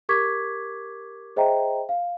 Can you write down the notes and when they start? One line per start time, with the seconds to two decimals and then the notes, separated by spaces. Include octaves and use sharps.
0.09 G4 A#4 C#6 D6 G#6 B6
1.36 G#4 C5 D#5 E5 G5 A#5
1.89 F5